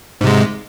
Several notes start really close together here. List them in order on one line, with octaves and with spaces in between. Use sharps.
G#2 C3 G#3